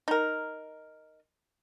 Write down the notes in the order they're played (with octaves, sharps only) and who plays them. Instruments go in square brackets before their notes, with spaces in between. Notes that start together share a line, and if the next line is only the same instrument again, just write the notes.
[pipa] D#4 A#4